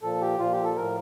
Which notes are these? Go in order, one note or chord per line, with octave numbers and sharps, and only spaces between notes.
A#2 F3 A4
G4
A#2 F3 F4
G4
A4
A2 F3 A#4